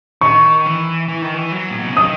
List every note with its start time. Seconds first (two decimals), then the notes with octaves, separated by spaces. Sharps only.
0.21 D#3 C#6
0.66 E3
1.08 E3
1.22 D#3
1.34 E3
1.52 F#3
1.70 A#2
1.80 B2
1.88 C#3
1.97 D#3 D#6